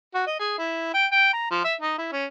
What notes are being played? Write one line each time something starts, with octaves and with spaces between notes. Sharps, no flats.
F#4
D#5
G#4
E4
G5
G5
A#5
F3
E5
D#4
E4
C#4